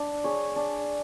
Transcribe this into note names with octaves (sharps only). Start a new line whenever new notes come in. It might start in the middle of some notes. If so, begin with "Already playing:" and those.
Already playing: D4
G#4 C#5
D4